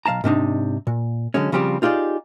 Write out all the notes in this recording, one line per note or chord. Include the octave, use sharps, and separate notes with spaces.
B1 G#3 F5 A5 A#5
G#2 C3 D4 D#4
A#2
D3 F#3 G#3 C#4
C#3 F3 G3 C4 G4
D#4 F4 G4 G#4 D5